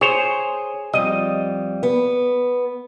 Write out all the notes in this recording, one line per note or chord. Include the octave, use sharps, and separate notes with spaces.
G#4 C5 C#5
F2 G3 D#5
B3